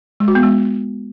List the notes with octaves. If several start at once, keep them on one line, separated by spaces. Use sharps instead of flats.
G#3
F#4
B3
G#3